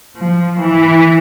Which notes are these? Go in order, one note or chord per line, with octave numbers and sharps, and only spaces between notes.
F3
E3